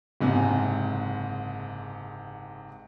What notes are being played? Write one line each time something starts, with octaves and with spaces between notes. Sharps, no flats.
F#1 G#2 C3 G#5